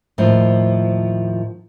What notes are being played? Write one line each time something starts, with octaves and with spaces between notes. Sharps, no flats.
D#2 A2 F3